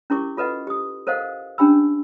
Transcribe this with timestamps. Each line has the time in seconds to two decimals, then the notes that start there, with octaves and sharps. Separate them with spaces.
0.10 C#4 E4 G4 A#4 C#6 D6
0.37 F4 A4 B4 D#5 F#5
0.67 G4 D#6
1.07 A4 A#4 C5 D#5 F5 F#5
1.58 C#4 D4 G4 G5 B5 E6